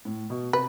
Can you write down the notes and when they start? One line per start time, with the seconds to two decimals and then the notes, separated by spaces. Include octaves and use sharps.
0.05 A2
0.30 B2
0.53 C3 B4